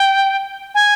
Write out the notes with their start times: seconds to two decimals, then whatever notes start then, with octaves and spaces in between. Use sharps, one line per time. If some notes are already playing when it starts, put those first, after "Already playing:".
Already playing: G5
0.75 G#5